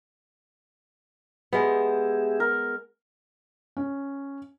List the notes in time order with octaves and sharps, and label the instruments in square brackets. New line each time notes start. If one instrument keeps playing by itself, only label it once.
[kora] G#3 B3 [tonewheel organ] G4 G#4 E5
[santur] A#4
[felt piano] C#4